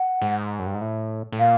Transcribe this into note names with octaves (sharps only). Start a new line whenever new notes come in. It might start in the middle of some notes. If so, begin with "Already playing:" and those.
Already playing: F#5
G#2
F#2
G2
G#2
A2
A2
A#2 F5